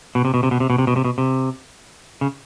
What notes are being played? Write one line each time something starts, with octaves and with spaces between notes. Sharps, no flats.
B2
C3
B2
C3
B2
C3
B2
C3
B2
C3
B2
C3
C#3